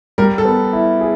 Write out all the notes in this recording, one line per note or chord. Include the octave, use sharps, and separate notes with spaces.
G3 A#4
A4
B3
E4
G#4